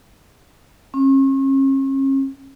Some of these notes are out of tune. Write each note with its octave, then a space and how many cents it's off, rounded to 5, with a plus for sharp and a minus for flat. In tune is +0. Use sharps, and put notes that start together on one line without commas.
C#4 -40